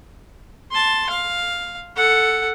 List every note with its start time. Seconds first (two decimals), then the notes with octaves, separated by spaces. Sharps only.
0.71 A5 C6
1.10 F5
1.96 A4 F#5